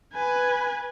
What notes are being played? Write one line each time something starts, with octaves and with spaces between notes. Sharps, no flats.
B4 G#5